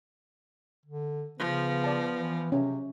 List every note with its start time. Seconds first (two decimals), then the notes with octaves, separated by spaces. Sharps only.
0.86 D3
1.39 C#3 F3 B3
1.84 D5 A5
2.16 E3
2.52 C3 C#4